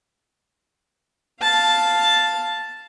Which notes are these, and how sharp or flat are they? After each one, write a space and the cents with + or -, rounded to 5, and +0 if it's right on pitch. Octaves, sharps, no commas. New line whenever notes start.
F5 +0 A5 +0